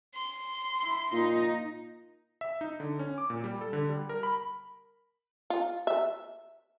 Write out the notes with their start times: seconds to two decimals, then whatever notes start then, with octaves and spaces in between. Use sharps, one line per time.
0.15 C6
0.80 E4
1.12 A#2 D#4
2.41 E5
2.61 D#4
2.80 D3
2.99 C#4
3.18 D6
3.30 A#2
3.44 G3
3.61 A4
3.73 D3
3.89 G3
4.09 A#4
4.23 B5
5.50 F4
5.87 E5